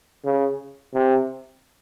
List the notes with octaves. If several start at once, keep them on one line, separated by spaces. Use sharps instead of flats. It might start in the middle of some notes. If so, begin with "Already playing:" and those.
C#3
C3